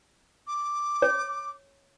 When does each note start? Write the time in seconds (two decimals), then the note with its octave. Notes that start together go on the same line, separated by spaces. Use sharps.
0.47 D6
1.02 C#5